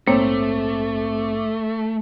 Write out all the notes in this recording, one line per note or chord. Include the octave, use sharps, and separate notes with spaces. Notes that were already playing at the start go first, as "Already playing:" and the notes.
A#1 G#2 A3 A#3 C4 C#5 D6